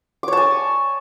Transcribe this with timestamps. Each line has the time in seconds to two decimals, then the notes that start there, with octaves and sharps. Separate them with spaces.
0.23 D6
0.28 C#5
0.33 A5
0.37 G#5